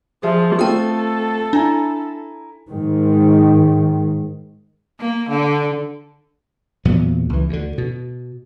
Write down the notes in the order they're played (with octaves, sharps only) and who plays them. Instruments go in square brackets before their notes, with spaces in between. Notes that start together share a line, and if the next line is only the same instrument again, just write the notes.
[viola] F3 [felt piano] G#4 E5
[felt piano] A3 C4 F4 [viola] A4 [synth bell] G5 D#6
[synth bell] D4 [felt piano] E4 G#5 A#5
[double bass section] G#2 D#3
[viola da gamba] A#3
D3
[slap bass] E2 A#2 F#3 B3
C#2 E3
D2 D3
B2